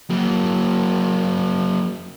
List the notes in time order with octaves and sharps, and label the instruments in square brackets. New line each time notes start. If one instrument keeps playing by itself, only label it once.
[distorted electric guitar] F#3 A#3